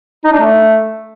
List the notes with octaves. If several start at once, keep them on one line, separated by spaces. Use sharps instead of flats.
D#4
D4
A3